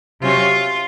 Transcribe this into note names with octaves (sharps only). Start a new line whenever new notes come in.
C3 F#3 C#4 F4